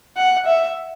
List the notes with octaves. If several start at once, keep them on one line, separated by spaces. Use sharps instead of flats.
F#5
E5